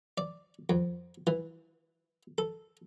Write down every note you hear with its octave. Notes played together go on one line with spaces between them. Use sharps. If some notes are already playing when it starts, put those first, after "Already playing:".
D5
F2
E3
A4